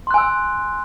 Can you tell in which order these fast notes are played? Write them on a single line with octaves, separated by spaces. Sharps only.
C6 F#6 G#5 E6